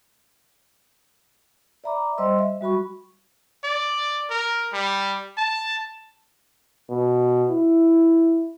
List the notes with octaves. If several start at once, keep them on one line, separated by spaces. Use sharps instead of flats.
D5 E5 A#5 B5 D6
G3 C5 D#5 C6 E6
E5
G3 F#4 B5 C#6
D5
A#4
G3
A5
B2
E4